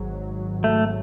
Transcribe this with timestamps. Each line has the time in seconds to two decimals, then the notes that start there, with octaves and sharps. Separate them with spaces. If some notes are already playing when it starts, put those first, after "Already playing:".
Already playing: G#1 G#2 F#3
0.64 A3